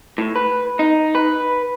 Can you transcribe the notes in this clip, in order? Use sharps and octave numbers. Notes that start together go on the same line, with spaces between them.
A2
B4
D#4
B4